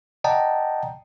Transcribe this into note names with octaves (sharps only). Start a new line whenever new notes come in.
D5 D#5 F#5 G5 A5 A#5